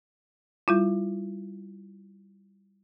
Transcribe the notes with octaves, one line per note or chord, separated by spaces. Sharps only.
G3 E4 F4